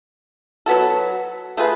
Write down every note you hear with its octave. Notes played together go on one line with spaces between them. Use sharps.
F#3 B3 F#4 A4
A3 F4 G#4 B4